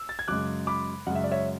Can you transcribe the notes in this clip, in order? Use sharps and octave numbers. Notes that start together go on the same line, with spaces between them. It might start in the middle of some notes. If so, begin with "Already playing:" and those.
Already playing: E6
A6
G#6
F#2 C#3 G#3 D6 F#6
B5 D6
F#2 C#3 G#3 F#5
E5
D5
C#5 E5